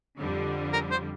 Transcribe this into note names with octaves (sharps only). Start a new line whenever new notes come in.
F2 D3 G3
A#4
C5